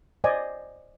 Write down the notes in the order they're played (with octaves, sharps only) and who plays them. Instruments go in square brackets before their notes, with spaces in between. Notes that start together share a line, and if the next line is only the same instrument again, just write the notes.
[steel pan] C5 D5 D#5 G#5